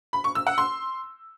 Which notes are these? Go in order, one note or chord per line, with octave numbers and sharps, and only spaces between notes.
B5
C#6
E6
F#5
C6